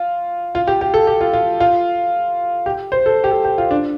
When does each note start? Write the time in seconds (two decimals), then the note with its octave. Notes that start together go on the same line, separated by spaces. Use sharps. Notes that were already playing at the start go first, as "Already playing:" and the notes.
Already playing: F4
0.55 F4
0.67 G4
0.81 G4
0.94 A4
1.07 G4
1.21 F4
1.33 F4
1.60 F4
2.66 G4
2.92 C5
3.06 A4
3.24 G4
3.31 A4
3.44 G4
3.58 F4
3.71 D4